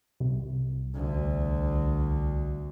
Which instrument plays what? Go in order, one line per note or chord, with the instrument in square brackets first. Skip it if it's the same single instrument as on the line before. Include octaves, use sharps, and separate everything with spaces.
[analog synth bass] C2
[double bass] D2